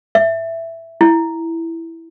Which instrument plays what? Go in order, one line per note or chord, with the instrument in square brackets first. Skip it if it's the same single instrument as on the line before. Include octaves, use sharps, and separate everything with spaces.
[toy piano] E5
E4